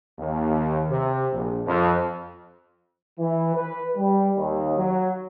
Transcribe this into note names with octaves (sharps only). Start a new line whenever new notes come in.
D#2
C3
A#1
F2
E3
B4
G3
D#2
F#3